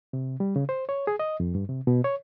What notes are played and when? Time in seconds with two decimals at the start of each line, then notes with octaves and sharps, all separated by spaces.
0.13 C3
0.40 G3
0.56 C#3
0.69 C5
0.89 C#5
1.07 G#4
1.19 D#5
1.40 F2
1.55 G2
1.69 C3
1.87 B2
2.04 C#5